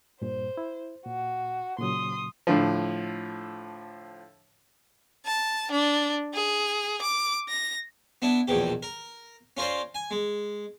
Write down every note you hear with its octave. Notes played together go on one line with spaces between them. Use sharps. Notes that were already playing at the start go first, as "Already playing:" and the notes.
G2 A#2 C5
E4
A#2 F#4
A#2 C#3 F#3 C6 D#6
A2 D3 F3
A5
D4
G#4
D6
A#6
B3 D4 E4
A#1 E2 B2 G4
A#4
C#4 F4 A#4 C5 D5
G#5
G#3